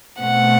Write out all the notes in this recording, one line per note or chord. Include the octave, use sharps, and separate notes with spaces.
B2 A3 C4 F#5